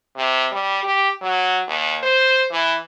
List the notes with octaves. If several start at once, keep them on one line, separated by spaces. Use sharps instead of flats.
C3
G3
G4
F#3
D#2
C5
E3